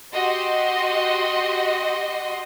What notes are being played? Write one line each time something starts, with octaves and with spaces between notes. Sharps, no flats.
F#4 G4 D#5 C6